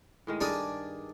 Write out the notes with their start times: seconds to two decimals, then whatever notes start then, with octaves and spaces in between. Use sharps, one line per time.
0.27 A2 D#3 G#3
0.41 G2 D#3 D4 G#4 D5